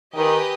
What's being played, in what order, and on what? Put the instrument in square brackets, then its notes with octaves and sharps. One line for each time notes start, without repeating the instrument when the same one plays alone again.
[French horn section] D#3 [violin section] G4 B4 D#5 G#5